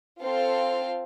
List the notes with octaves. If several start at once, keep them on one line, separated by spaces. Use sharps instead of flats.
C4 F4 A4 F5